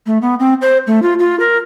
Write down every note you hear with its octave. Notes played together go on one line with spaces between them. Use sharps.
A3
B3
C4
C5
A3
F4
F4
A#4